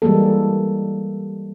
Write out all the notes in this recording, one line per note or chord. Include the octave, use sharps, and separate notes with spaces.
E3 G3 G#3 A#3 A4